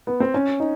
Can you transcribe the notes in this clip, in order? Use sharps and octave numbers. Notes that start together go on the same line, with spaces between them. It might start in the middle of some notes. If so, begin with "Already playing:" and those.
B3
C4
C#4
D#4